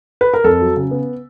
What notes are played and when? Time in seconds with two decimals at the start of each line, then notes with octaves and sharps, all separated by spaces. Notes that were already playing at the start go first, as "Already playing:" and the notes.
0.21 B4
0.34 A#4
0.44 F2 A4
0.61 F#3
0.76 C#3
0.91 B3